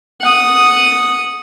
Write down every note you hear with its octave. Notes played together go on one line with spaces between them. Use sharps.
F#5 D#6